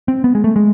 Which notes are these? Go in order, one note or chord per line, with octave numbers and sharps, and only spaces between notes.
C4
B3
G#3
A3
G#3